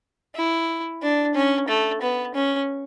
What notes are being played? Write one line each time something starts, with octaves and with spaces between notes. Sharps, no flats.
E4
D4
C#4
A3
B3
C#4